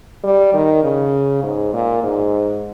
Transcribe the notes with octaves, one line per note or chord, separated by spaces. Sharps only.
G3
D#3
C#3
G#2
A#2
G#2